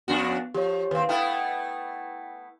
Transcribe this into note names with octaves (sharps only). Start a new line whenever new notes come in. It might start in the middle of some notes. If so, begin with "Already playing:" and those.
F2 B3 D4 F#4
F3 G4 C#5
D#2 C4 B4 F5
A3 B3 E4 G5 F6